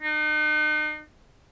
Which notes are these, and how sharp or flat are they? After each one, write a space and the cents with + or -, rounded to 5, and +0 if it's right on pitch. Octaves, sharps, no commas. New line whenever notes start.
D#4 -40